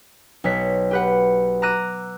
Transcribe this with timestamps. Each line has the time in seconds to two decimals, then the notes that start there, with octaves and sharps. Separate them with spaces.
0.44 B1 C#5 B6
0.91 G4 B4 F#5
1.62 A#5 D6 E6 F#6 A#6 D#7